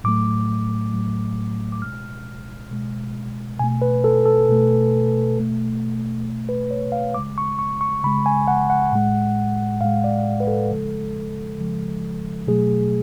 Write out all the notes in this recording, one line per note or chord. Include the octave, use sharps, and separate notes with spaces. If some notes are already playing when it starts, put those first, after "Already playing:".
A2 F#3 A3 D6
A2 F#3 A3
D6
B2 G#3 F6
B2 G#3
B2 A3 G#5
B4
A4
A4
B2 A3
B2 A3
B2 A3
B4
C#5
F5
C#3 G#3 D6
C#6
C#6
C#6
C#3 G#3 B5
G#5
F#5
F#5
A2 G#3
A2 G#3 F5
D5
B4
A4
C#3 F3 G#3
C#3 F3 G#3
B2 F#3 A3 G#4